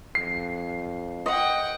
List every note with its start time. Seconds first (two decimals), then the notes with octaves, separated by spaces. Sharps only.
0.15 F2 C7
1.26 D#5 F#5 G5